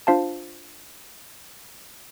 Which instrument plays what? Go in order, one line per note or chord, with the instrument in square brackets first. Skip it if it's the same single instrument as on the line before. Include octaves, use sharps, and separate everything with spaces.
[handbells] D4 F4 C5 F5 A5